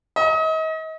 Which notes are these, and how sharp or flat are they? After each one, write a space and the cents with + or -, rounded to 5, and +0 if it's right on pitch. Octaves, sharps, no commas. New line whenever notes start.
D#5 +35